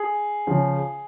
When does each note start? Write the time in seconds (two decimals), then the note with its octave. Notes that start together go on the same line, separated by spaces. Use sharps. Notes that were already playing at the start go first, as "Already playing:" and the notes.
Already playing: G#4
0.47 C#3 F3